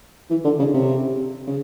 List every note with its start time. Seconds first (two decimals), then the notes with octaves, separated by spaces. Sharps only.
0.30 E3
0.45 D3
0.59 C#3
0.74 C3
1.47 C#3